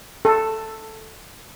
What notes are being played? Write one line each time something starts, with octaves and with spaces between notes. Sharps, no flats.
A4